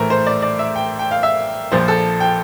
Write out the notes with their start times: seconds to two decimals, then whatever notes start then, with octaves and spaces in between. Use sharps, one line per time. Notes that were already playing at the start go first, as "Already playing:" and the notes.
Already playing: A#1 A2 E3 A3 A#4 C5
0.10 C5
0.27 D5
0.42 D5
0.59 E5
0.76 G5
0.99 G5
1.11 F5
1.23 E5
1.72 A#1 A#2 F3 C5
1.88 A4
2.20 G5